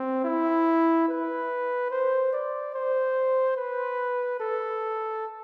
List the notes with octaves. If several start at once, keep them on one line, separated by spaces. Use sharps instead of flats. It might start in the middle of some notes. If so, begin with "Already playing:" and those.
Already playing: C4
E4
B4
C5
D5
C5
B4
A4